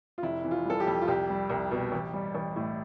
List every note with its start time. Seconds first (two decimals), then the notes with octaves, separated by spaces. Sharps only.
0.18 F4
0.22 F1 E4
0.44 E3
0.51 F4
0.65 G3 A4
0.80 G4
0.87 F2
1.02 F4
1.08 C2 G4
1.30 G3
1.49 C2
1.71 B2
1.92 A1
2.14 G3
2.35 A1
2.56 A2